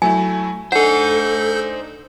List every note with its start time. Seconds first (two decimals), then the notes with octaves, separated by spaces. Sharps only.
0.02 F#3 A3 E4 G#5
0.72 D4 D#4 A4 C5 F#5 G#5 G6